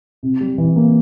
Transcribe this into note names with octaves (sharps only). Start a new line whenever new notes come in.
C3
G3
E3
A#3